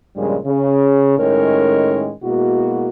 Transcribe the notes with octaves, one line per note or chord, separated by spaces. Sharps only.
G2 A#2 C#3 F3 G3 G#3
C#3
A2 D#3 G#3 C#4 A#4 C#5
B2 G#3 A#3 E4 F#4